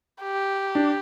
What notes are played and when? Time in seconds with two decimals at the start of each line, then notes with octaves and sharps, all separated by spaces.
0.22 G4
0.75 D4